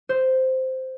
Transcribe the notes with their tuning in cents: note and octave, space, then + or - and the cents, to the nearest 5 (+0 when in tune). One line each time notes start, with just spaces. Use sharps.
C5 -5